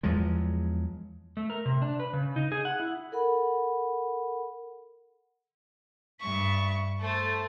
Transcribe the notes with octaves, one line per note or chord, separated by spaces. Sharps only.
E2 F3 F#3 G#3
A3
A#4
C3
D4
B4
C#3
D#4
G#4
F#5
E4
A4 A#4 F#5 B5
G2 E5 C#6
A3 A4 C5